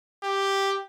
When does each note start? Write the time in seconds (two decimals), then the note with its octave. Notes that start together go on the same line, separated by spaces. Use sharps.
0.23 G4